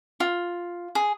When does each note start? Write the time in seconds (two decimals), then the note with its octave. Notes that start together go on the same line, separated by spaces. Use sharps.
0.20 F4
0.95 G#4